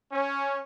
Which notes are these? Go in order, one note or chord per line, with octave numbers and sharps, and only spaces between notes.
C#4